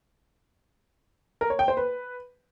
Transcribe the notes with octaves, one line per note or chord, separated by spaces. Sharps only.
A#4
C#5
G5
C5
B4